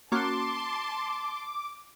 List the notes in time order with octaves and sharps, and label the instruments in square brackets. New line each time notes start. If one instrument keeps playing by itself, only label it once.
[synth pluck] A#3 C#4 F#4 [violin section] A5 C6 [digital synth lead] D6